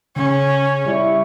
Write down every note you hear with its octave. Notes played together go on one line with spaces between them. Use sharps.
C#3 C#4
G3 E4 C#6